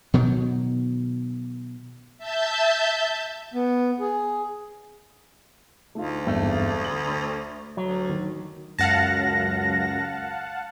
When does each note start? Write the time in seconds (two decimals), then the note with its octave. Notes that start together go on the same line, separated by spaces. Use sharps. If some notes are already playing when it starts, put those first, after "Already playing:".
0.14 B2 D#3 F#3
2.18 E5 A5 G6
3.54 B3
4.00 G#4
5.95 D2 A3 D#4 F4
6.27 G#1 E2 G2 A3
6.85 D3 F#7
7.12 C5
7.77 D2 F#3
8.09 D#3 F#4
8.79 C#2 F#2 F5 F#5 A5 A#6